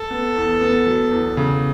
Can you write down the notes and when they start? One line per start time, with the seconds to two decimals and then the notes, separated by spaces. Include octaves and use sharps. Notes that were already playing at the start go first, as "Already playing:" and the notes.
Already playing: A4
0.10 B3
0.36 E2
0.61 B3
0.86 F#3
1.11 E2
1.37 C#3